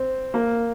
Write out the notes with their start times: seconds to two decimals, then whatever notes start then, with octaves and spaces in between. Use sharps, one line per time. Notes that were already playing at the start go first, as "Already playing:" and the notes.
Already playing: C4
0.34 A#3